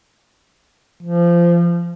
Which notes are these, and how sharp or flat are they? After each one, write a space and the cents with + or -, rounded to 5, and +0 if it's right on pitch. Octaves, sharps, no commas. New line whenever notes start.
F3 -20